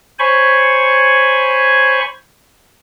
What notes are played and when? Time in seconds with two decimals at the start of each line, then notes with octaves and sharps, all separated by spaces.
0.19 C5 C#5 G#5 B5 C#6